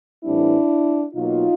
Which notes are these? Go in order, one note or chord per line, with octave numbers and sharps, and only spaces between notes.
A2 E3 G3 C4 D4 E4
B2 F#3 A#3 D#4 F4